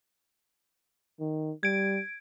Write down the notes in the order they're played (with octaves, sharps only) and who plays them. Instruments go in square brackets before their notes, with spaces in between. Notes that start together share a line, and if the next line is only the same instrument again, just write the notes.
[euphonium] D#3
[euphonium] G3 [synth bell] G#6 D7